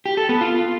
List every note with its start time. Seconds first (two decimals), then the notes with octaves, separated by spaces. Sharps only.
0.06 G4
0.17 A4
0.29 B3
0.41 F4